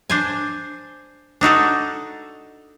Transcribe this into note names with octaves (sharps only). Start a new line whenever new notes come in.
D4 C5 G#5
D4 D#4 F#4 A4